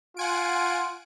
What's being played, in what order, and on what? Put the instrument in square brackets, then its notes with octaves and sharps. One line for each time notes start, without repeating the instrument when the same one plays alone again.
[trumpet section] F4 [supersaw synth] F#5 G#5 D7